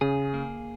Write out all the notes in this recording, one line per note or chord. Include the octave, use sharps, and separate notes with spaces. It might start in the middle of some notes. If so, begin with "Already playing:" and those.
C#3 G#4
A#3